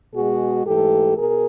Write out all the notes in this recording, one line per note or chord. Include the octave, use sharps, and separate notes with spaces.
B2 G#3 F#4 G#4
G#2 E3 A3 G4 A4
B2 G#4 A#4